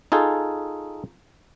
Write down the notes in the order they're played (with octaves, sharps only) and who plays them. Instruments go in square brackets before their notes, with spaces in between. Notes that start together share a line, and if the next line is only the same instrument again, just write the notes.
[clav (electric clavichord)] D#4 F4 G#4 A4